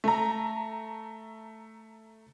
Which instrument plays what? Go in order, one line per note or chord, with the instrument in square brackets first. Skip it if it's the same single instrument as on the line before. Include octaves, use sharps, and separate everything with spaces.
[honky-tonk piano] A3 A#5